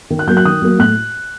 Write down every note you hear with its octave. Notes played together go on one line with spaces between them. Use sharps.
D#3
F#6
F#3 A#3 G6
F#6
D#3 D#6
F#3 A#3
A2 F#6